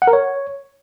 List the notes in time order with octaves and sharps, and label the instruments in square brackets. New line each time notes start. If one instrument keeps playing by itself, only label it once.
[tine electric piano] F#5
A#4
C#5